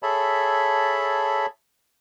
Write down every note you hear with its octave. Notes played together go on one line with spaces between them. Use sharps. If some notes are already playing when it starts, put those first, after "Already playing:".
G#4 A4 C#5 E5 A5 B5